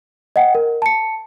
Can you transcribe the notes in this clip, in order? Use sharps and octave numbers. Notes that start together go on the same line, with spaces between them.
D#5 F#5 G5
A#4
A5 C#7